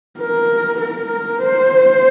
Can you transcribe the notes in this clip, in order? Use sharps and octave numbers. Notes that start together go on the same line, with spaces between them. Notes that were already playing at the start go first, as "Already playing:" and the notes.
A#4
A#4
C5